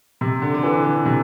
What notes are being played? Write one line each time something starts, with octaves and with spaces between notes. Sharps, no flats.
C3
D3
D3
E3
D3
C3